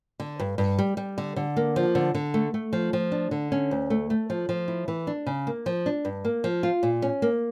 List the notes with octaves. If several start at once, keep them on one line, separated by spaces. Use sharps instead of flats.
D3
G2
G2
G3
G3
D3
D3
A#3
F3
D3
D3
A3
A3
F3
F3
D4
D3
C#4
D2
A3
A3
F3
F3
E4
E3
D4
C#3
A#3
F3
D4
G2
A#3
F3
F4
A#2
C#4
A#3